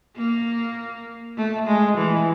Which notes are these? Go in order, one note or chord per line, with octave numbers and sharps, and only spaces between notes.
A#3
A3
G#3
E3